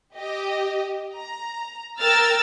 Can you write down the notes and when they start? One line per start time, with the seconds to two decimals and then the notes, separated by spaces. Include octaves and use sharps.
0.16 G4 D#5
1.16 A#5
2.00 A#4 G5 E6 F6 A6